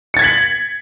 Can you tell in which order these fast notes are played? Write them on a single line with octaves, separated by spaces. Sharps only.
C#7 A6 G#6 B6 F#7